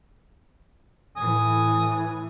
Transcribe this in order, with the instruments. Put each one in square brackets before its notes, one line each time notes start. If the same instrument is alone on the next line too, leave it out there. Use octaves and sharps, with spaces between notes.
[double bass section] A2 E3 [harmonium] G#5 [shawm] D#6